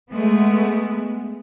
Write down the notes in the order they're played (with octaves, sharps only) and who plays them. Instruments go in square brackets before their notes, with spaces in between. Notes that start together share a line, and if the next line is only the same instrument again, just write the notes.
[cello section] G#3 A3 B3